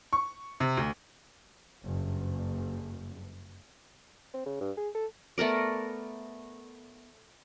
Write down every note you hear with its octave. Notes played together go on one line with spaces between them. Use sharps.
C#6
C3
D2
F#1 G2
C4
C#3
G2
G#4
A4
A3 B3 A#4 D5